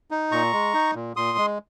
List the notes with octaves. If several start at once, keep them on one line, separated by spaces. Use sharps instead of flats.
D#4
A#2 A#5 C#6
G#3
D#4
A#2
A#2 C6 D#6
G#3